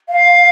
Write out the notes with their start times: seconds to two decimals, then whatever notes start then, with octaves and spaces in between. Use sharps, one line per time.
0.09 F5